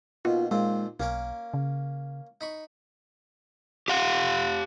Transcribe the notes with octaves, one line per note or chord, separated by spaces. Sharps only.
D#2 B2 F4
D#2 A#2 G#3 C4
B1 A#3 C#4 A#4
C#3
D#4 B5 C#6
G4 F5 F#5